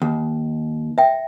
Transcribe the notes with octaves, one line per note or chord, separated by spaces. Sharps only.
D#2
E5 G5